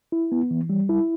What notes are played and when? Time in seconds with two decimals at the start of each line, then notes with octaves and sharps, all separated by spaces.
0.12 E4
0.32 B3
0.51 E3
0.70 G3
0.89 E4